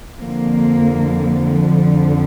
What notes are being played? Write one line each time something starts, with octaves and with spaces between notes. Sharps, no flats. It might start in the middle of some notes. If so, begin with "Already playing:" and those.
F2 D3 F3 A#3